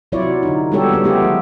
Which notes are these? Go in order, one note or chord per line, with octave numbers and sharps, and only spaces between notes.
C3 F#3 E4 F4 C#5 D5
D3 D#4
G3 G#3 B3 G4 A4 C#5
C#3 B3 C#5
G#3 A3 B3 F4 G4 G#4
F3